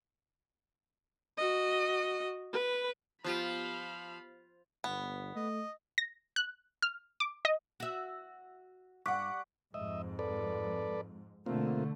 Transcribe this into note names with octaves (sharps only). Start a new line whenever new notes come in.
F#4 D#5
B4
F3 B3 F4 G4 F5 B5
G1 B3
A3 D#5
A#6
F#6
F6
D6
D#5
F#4 E5
G2 F#5 C#6 D6 F#6 B6
F2 G#2 D#5 E5
A4 B4 D5
B2 D3 A3 A#3 C4 F4